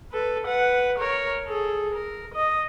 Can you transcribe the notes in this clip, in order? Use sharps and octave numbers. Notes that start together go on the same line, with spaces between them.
A4 B4
B4 F#5
A#4 C#5
G#4 A4
A#4
D#5